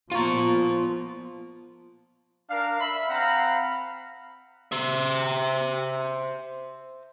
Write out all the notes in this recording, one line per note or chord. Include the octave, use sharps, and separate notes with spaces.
F3 B3 F4 F5 A#5 C#6
D4 A#4 F5
E5 B5
C4 F5 F#5 A#5 B5
C5 E5